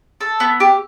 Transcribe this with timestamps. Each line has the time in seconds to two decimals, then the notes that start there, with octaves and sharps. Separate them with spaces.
0.21 A4
0.40 B3
0.60 G4